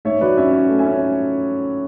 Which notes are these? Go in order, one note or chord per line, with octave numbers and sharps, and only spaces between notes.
G#2 C#5 E5
F#3 B4 D5
C#4 C#5 E5
C#4
A3
E5 G#5
C#4